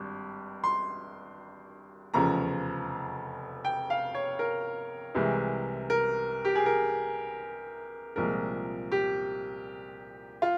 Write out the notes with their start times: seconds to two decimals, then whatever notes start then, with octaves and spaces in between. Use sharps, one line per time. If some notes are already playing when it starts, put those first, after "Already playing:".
Already playing: G#1 G2
0.64 C6
2.14 F1 E2 C#3 F3 A#5
3.65 G5
3.90 F5
4.15 C#5
4.39 A#4
5.15 C2 C3 E3 G#3
5.90 A#4
6.45 G4
6.55 G#4
6.66 A#4
8.16 C2 A#2 F3 G#3 A#4
8.92 G4
10.42 F4